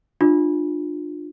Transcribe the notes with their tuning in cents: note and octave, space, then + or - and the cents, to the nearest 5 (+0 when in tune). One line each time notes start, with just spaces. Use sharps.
D4 +40 F4 +20